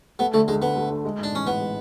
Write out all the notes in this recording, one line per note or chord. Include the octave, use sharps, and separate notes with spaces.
A3 B3
D3 A3
D2 G#3
D2 B3
A3
D3
G#3
G#2
D4
A1 C#4
A1 B3
G#3